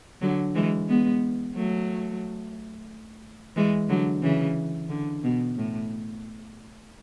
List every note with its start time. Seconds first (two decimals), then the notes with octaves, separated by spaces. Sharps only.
0.21 D3 F#3
0.55 E3 G#3
0.88 G#3 B3
1.55 F#3 A3
3.56 E3 G#3
3.89 D3 F#3
4.23 C#3 E3
4.89 D3
5.23 B2
5.57 A2